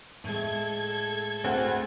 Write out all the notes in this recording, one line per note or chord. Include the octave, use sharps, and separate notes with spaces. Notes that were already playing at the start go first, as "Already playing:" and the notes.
A2 G#3 A4 G#6
D2 C4 F#5